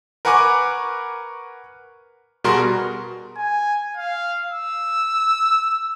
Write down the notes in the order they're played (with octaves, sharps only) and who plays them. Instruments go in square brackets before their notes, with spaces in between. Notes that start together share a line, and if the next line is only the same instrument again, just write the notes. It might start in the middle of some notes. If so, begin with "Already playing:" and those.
[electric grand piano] A#4 B4 F#5 G#5 C#6 D6
B2 G3 F#4 G#4 A#4 C6
[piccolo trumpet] G#5
F5
E6